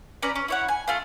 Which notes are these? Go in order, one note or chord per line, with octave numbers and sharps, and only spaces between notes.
C#4 B4 D5 A#5
C#4
E4 C#5 F#5
G#5
A3 F4 F5